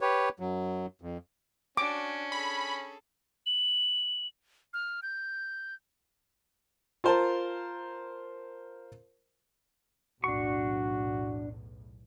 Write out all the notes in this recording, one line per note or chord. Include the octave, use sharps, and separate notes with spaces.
G4 B4 C#5
F#2 F#3
F2
C#4 D4 F#4 D6
G#4 A4 B5
F#7
F6
G6
F4 A#4 C5 A5
B1 E2 A2 D4 F#4 C#6